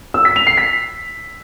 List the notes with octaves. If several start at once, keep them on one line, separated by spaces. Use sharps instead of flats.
E6
B6
F7
C7
B6